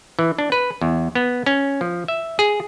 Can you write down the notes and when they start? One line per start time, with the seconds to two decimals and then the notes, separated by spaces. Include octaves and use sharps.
0.19 E3
0.38 D4
0.52 B4
0.81 E2
1.15 B3
1.46 C#4
1.81 F3
2.08 E5
2.39 G#4